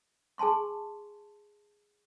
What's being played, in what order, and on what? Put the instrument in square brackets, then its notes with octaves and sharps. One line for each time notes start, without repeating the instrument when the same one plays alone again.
[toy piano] G#4 G#5 A5 C6 C#6